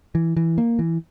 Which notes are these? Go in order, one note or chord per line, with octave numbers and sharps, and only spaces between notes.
E3
E3
A#3
E3